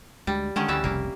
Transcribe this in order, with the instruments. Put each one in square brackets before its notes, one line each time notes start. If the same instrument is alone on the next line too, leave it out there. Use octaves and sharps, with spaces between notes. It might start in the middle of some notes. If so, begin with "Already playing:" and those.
[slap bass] D2 G#3 [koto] G3
[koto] D3 D#3 C#4 [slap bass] G#3
[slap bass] D2 [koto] E3 G3 E5
[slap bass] F1 C2 C#3 [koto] A#3